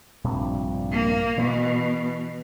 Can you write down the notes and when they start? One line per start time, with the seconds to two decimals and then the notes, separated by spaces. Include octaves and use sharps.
0.24 A#1 G2 C3
0.92 A#3
1.38 B2 E3